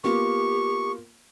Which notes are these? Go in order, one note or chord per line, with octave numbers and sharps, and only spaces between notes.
A#3 B3 F4 G4 C#6